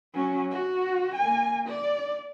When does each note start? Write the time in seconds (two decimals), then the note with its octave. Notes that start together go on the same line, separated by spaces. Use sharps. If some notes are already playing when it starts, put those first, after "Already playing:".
0.14 F#3 C#4
0.51 F#4
1.15 A#3 G#5
1.67 D5